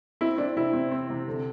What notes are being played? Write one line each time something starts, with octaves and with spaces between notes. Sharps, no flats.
C4 E4
C4 D4
C3 E4
C4
C4
C3
D3